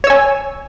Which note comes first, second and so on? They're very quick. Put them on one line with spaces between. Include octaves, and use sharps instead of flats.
C#5 E6 G#5